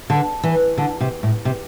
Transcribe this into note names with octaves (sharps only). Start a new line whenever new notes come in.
D3
E3
D3
C3
A2
C3